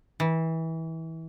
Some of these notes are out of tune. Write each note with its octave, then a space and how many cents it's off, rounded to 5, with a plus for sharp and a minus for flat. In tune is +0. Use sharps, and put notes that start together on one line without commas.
E3 -25